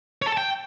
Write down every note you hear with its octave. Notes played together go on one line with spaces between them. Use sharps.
C#5
A4
A5
G5